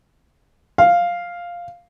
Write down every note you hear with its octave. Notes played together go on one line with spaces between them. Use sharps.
F5